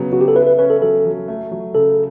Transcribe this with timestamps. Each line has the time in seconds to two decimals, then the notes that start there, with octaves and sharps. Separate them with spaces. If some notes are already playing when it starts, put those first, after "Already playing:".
Already playing: C#3 F#3 B3
0.12 C#3 F#4
0.21 G4
0.28 A4
0.36 E4 B4
0.47 B4
0.59 C#4 B4
0.70 A4
0.82 F#3 A4
1.05 F#3
1.28 A3
1.51 F#3
1.75 C#3 A4